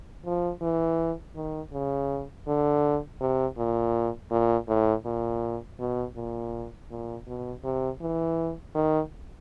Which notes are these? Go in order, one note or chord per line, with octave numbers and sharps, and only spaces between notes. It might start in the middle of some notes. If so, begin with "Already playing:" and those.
F3
E3
D#3
C#3
D3
C3
A#2
A#2
A2
A#2
B2
A#2
A#2
B2
C3
E3
D#3